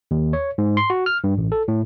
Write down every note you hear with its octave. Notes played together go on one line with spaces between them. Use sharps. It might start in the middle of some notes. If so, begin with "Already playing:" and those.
D#2
C#5
G#2
C6
F#4
F6
G2
A1
A4
A2